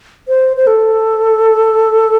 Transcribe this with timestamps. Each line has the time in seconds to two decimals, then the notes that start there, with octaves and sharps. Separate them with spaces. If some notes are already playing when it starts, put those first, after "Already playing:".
0.28 C5
0.57 C5
0.67 A4